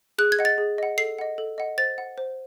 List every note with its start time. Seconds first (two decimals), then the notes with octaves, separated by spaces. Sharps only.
0.18 G#4 F#6
0.32 G#6
0.39 D#5 F#5
0.45 A6
0.58 G#4
0.78 D#5 F#5
0.98 A4 C7
1.19 D#5 F#5
1.38 A4
1.58 D#5 F#5
1.78 C5 A6
1.98 F#5
2.18 C5